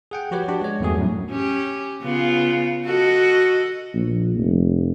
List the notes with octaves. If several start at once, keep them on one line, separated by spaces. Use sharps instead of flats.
G#4 F#5 G5
F3 F#4 G4 B4 C#5
D4 F#4 G4
G#3 C#5
E2 G2 A3 F#4 G#4
F#2 A2
C#4 G4
C#3 B3 F4
F#4 A4 D#5
A#1
F1